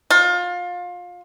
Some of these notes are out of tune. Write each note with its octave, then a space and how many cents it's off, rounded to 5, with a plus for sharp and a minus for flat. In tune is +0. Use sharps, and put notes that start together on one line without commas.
F4 +25